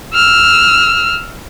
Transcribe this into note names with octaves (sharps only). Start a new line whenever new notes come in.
E6 F6